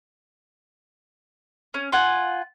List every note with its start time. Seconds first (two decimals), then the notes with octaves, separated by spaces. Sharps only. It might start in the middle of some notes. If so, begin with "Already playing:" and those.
1.74 C#4
1.92 F4 F#5 G#5